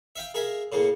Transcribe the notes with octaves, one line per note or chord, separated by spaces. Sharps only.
E5 F5 G5
G#4 A#4 E5 F5
A2 C#3 A#3